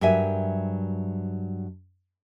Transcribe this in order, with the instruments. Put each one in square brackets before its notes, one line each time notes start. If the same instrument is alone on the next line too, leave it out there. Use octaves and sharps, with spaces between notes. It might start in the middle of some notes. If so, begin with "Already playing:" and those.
[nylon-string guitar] G2 F#3 A#4 E5 G#5